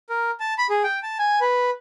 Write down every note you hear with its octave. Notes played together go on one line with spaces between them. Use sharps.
A#4
A5
B5
G#4
G5
A5
G#5
B4